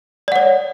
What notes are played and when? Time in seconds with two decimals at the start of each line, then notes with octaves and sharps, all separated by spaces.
0.28 D5
0.32 F#5
0.36 C#5